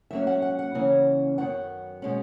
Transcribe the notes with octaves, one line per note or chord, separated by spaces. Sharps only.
G#2 F#3 A#3 C#4 E5
F#5
F#5
F#5
C#3 E3 A#3 C#4
F#2 D#3 F#3 B3 F#5
B2 G#3 C#4